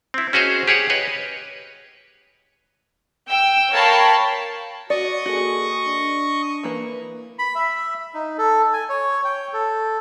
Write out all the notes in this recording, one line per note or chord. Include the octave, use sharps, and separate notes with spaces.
C4 E4
C#4 F#4 G#4 C5 C#5 D#5
G4 G#4 C#5 F#5
B4 C#5 D#5
G5 E6
A#4 C#5 F5 G5 A5 B5
F#4 D5 D#5 C#6
A#3 F#4 G#4 A4
D4
E3 A#3 B4
B5
E5
D#4
A4
G#5
C#5
G5
A4